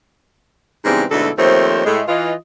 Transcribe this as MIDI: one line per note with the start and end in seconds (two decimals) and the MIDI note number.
0.85 1.04 44
0.85 1.04 49
0.85 1.04 52
0.85 1.04 55
0.85 1.04 59
0.85 1.04 60
1.11 1.29 38
1.11 1.29 44
1.11 1.29 47
1.11 1.29 50
1.11 1.29 64
1.11 1.29 69
1.38 1.84 39
1.38 1.84 53
1.38 1.84 57
1.38 1.84 60
1.38 1.84 72
1.38 1.84 73
1.85 2.01 45
1.85 2.01 56
1.85 2.01 57
2.08 2.33 52
2.08 2.33 65
2.08 2.33 75